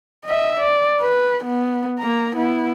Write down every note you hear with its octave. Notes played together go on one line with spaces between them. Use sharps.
D#5 E5
D5
B4
B3
A#3 A#5
B3 E4